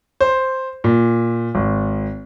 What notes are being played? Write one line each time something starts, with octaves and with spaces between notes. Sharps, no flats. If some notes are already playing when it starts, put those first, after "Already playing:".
C5
A#2
G#1